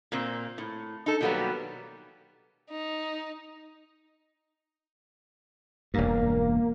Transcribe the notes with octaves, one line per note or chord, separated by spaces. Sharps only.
A#2 A#3 C4
A2
D#4 A4
B2 D#3 F#3 G3 A#3 B3
D#4
E1 G2 A#3